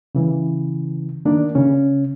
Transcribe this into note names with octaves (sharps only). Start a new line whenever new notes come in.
C#3 E3
D#3 A#3 D4
C#3 C#4